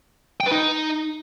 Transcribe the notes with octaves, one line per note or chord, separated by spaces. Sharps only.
G5
B4
D#4